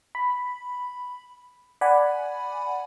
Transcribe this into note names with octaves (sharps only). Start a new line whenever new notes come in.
B5
D5 F#5 G#5 B5